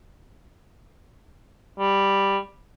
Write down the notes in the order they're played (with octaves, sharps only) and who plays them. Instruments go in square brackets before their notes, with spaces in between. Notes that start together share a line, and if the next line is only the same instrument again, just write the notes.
[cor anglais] G3